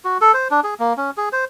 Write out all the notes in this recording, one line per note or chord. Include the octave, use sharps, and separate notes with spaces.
F#4
A4
C5
D4
G#4
A#3
C#4
G#4
C5